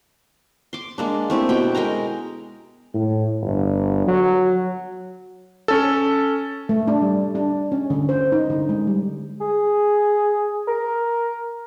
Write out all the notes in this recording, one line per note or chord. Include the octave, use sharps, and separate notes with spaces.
C6 D6
G#3 A#3 D4
A3 C4 E4 G4
B2 G5
G#3 A#4 G5 A#5
A2
G1
F#3
C#4 A4
A3
D4
G3
D4
C#4
D3
C5
D#4
D3
G#3
G3
G#4
A#4